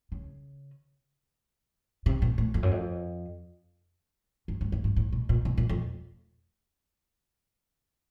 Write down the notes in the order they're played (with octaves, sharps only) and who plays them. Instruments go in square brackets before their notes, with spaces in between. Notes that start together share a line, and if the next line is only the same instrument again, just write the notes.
[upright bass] C#3
C3
A#2
A2
F2
F#2
F2
F#2
G2
G2
G#2
A2
B2
A#2
B2
A#2
F2